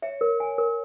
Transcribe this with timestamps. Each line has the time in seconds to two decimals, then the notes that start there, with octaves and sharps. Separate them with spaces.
0.02 C#5 E5
0.21 A#4
0.40 G#5
0.58 A#4